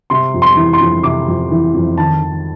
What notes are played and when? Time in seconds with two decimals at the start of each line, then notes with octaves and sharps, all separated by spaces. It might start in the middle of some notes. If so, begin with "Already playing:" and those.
0.10 C3 C6
0.34 F2
0.42 C6
0.57 E3
0.73 C6
0.80 F2
1.03 C3 D6
1.28 F2
1.51 E3
1.74 F2
1.98 D#3 A5
2.22 D#3